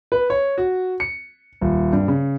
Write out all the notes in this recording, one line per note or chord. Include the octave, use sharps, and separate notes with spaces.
B4
C#5
F#4
C#7
D#1
G2
C#3